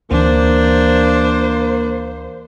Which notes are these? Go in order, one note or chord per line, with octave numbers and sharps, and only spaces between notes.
D2 E3 A#3 D4 C5